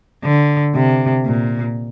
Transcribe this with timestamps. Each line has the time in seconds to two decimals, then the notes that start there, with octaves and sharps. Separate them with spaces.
0.24 D3
0.75 C3
1.26 A#2